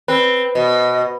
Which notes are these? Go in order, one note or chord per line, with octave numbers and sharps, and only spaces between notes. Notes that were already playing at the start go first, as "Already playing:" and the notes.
C4 B4
B2 D#5